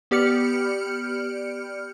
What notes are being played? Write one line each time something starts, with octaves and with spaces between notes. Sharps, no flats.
B3 G4 D5 F6 C#7